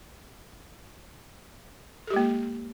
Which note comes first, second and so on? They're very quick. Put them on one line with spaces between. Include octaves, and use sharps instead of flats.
A4 G4 G#3 A#3